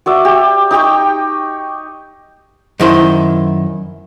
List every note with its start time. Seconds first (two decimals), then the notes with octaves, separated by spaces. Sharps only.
0.06 F#4 D5 E5
0.25 G4
0.71 D#4 G4 G5 C#6
2.80 F#2 D#3 E4 C5